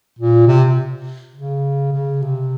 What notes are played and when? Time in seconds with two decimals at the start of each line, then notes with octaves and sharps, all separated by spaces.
0.19 A#2
0.47 C3
1.35 C#3
1.93 C#3
2.22 C3